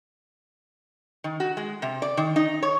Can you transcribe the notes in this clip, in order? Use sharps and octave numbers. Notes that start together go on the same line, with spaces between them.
D#3
F#4
G#3
C3
D5
D#3
D#4
C#5